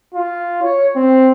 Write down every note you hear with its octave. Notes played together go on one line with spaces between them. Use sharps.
F4
C#5
C4